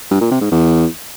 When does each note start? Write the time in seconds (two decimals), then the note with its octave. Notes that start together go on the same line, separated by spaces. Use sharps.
0.11 G2
0.21 A#2
0.31 C3
0.41 G#2
0.51 E2